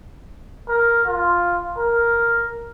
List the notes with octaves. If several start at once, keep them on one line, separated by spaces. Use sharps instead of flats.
A#4
F4
A#4